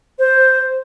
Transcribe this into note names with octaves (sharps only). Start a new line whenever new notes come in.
C5